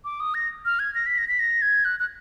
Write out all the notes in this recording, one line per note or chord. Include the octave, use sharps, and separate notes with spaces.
D6
D#6
A#6
F6
G#6
A#6
B6
A#6
B6
A#6
G#6
F#6
F#6